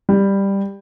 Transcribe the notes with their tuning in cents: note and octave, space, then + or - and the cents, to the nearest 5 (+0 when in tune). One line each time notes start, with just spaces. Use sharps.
G3 +10